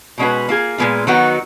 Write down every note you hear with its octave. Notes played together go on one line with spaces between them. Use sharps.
B2 G#3 C#4 F#4 B4
A#3 F4 G#4
A#2 F3 G#3 B3 F4
D#3 F#3 B3 D#4 F#4